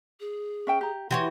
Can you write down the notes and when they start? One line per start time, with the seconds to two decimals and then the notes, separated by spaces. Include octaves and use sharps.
0.20 G#4
0.67 C#4 E5 G5
0.81 G4 A#5
1.11 E3 F#4 G4 C#5 C6